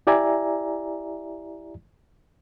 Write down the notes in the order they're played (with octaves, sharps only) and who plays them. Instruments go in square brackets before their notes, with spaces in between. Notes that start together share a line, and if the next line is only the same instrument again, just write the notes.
[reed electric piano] E4 G4 D5 E5 G#5 A#5